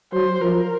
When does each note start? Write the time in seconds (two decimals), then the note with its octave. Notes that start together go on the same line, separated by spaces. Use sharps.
0.13 F#3 C5
0.41 F3 A#4